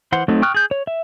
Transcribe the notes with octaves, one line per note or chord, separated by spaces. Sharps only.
E3 C5 F#5 C6
F#3 A3 C4 D#4
G5 C#6 D#6 F6 F#6
G#4 G6
C#5
E5